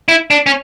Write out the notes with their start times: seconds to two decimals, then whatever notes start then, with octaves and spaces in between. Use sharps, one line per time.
0.08 E4
0.30 D4
0.46 C#4